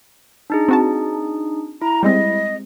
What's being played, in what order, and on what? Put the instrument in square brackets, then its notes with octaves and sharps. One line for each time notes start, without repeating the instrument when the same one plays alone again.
[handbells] D4 D#4 G#4
[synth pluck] C4 F#4 A5
[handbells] E4 [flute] A#5
[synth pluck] G3 G#3 C4 [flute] D#5